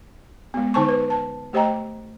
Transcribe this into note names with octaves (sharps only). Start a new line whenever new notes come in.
G#3 B3
D3 D#4 C5 G#5 A5 C#6
B4
A5
A3 G4 C5 D#5 G5 A#5